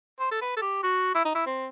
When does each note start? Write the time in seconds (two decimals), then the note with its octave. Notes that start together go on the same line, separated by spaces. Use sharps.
0.20 C5
0.31 A4
0.42 B4
0.57 A4
0.62 G4
0.83 F#4
1.15 E4
1.25 D#4
1.35 E4
1.46 C4